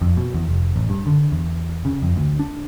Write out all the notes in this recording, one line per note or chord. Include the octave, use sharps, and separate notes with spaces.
F2
B2
E2
F1
A1
G2
D3
E2
C#3
F2
D2
D4